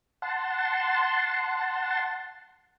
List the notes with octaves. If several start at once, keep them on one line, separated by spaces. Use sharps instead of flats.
F#5 A5 C6